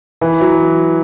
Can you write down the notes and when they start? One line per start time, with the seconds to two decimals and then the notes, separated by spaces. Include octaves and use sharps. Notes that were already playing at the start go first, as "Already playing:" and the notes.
0.21 E3
0.41 F#3